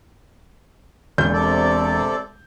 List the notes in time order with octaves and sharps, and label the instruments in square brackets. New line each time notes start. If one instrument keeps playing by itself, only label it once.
[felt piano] E1 G6 [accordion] A#2
[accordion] C3 A4 D5